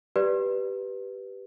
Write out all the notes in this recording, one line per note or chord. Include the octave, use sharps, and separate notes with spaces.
G4 B4 D5